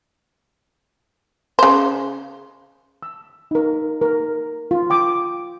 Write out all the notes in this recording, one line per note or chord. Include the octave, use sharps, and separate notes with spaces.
C#3 C5
E6
D#4 A#4
A#4
F4
G5 D6 D#6